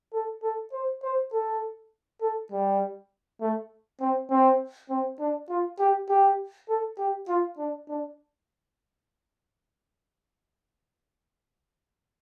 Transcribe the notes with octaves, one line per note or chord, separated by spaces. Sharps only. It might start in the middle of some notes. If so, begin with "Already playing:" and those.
A4
A4
C5
C5
A4
A4
G3
A3
C4
C4
C4
D4
F4
G4
G4
A4
G4
F4
D4
D4